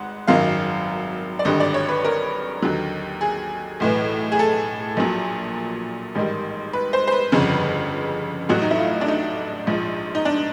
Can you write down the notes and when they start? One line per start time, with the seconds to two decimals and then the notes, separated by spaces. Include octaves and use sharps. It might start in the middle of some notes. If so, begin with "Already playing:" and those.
Already playing: G#1 G#2 F#5
0.27 G#1 F#2 D#3 F#3 F5
1.39 D5
1.45 G#1 G2 D3 G3 D#5
1.60 D5
1.74 C#5
1.89 B4
2.04 A#4
2.62 D#2 D3 F#3
3.21 G#4
3.80 B1 A2 E3
4.32 G#4
4.39 A4
4.97 A#1 A#2 F#3
6.15 A1 G#2 D#3 G3
6.73 B4
6.93 C5
7.07 C5
7.12 B4
7.32 G1 F2 C#3
8.49 A1 A2 F#3 F#4
8.62 D#4
8.71 E4
8.79 F4
9.01 D4
9.08 D#4
9.67 A#1 G#2 F3
10.15 D#4
10.25 D4